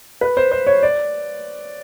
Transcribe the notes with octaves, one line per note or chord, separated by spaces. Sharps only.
B4
C5
C5
C#5
D5